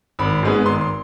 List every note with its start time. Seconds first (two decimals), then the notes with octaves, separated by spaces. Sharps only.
0.19 G#1 B5
0.43 G#2 G#3 B3
0.66 G#1 C6
0.81 C6